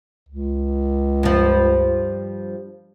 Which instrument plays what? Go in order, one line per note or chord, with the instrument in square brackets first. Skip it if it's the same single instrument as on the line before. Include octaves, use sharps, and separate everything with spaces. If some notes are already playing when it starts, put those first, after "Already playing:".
[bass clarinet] C#2
[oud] G2 F3